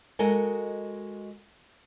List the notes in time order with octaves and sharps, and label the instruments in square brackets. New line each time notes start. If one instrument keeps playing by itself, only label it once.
[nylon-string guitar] G#3 F#4 A4 A#4 D#5 G#5